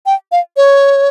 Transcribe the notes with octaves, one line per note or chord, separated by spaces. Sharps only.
G5
F5
C#5